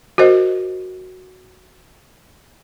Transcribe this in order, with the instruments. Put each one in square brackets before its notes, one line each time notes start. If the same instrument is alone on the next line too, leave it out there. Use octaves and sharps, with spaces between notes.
[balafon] F#4 A#4 C5 D#5